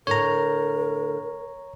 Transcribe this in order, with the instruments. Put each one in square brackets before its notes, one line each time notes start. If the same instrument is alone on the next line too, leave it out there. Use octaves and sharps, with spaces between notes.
[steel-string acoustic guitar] A2 D3 [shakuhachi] A#4 [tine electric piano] C#5 A#5